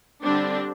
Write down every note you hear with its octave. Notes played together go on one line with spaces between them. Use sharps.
D3 G3 C4 D4